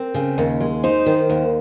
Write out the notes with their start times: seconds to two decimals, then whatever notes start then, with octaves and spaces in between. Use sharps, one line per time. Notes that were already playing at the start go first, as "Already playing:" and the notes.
Already playing: C4 A#4
0.14 C#3
0.38 D#2
0.60 G#3
0.83 D#4 C5
1.06 D#3
1.29 D#2